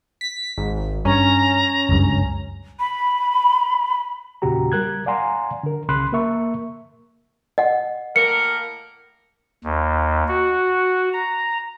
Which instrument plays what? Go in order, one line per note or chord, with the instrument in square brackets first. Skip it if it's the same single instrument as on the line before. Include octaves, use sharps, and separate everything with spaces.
[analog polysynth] B6
G#1
[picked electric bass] G2 [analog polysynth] C#4 [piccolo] A#5
[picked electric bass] F#1 C#2 G2
[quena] B5
[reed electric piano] E2 A#2 C#3 F#4 G4 A#5
G3 A#4 F#6 G#6
D5 F5 F#5 G#5 A#5 C6
D3 A#4
C2 C#3 B5 C6 F#6
A#3 A#4 E5 C#6
[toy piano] D#5 F#5
[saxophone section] A2 A#3 A#4 [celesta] C#7
[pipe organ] D#2
F#4
A#5